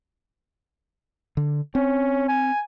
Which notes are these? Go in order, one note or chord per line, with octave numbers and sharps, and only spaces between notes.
D3
C4 C#4
G#5